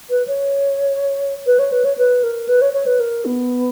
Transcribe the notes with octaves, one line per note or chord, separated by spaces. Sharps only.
B4
C#5
B4
C#5
B4
C#5
B4
A#4
B4
C#5
C#5
B4
A#4
B3